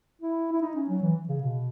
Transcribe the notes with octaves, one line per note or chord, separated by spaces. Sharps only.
E4
E4
D#4
C#4
F#3
E3
C#3
B2